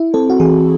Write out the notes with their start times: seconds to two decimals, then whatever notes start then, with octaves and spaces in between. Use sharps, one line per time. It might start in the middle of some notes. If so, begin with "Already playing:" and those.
Already playing: E4
0.14 C4 A4
0.30 F#4
0.40 E3 G#4